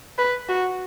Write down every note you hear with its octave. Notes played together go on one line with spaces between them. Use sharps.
B4
F#4